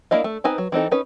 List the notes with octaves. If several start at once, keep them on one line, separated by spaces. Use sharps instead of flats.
A#3 D4 E4 D#5 F5
A3
C4 D#4 B4 G#5
F#3
E3 C4 D#4 A4
C#4 D#4 B4